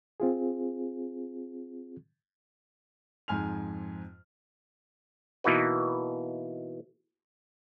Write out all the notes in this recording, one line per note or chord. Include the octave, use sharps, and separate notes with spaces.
C4 F4 G#4
F2 G#2 G#5 F6 F7
B2 E3 A#3 D#4 F#4 B4